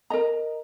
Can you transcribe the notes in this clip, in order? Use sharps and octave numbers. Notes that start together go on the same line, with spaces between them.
A#4 D#5 A#5